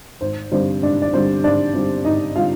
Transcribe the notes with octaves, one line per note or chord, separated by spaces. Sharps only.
G#1 C5
G2 D3 G3 C4 C5
G#1 D4 D5
D5
G2 D3 G3 C4 C5
G#1 D4 D5
G2 D3 G3 C4
G#1 D#4 D#5
D3 G3 C4 F4 F5